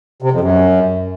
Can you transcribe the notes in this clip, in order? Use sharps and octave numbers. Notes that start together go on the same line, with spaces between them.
C3
F2
F#2